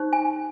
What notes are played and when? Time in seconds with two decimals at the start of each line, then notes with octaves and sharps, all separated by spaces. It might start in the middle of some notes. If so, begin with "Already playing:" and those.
Already playing: D#4 G4 C5
0.13 G#5